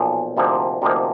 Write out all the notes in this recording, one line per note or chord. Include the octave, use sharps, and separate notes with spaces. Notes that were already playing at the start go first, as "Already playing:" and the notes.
Already playing: B1 A#2 F3
D2 C3 F3 A#3 D#4
D2 C3 F3 A#3 D#4